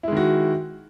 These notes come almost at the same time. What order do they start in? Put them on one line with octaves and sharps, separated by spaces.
E4 G#3 D#3 F#4